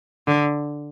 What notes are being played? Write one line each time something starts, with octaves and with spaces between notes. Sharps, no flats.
D3